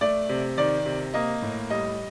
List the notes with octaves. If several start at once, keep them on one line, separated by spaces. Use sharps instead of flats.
A3 D5
C3
D#3 D5
C3
A#3 D#5
A2
G3 D#5